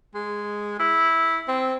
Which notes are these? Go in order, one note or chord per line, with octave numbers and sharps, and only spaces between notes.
G#3
E4
C4